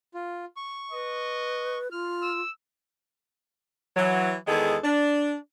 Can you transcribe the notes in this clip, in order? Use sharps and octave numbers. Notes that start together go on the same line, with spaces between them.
F4
C#6
B4 D#5
F4 F6
E6
E3 F#3
E2 D#3 G#3 G#4 A4
D4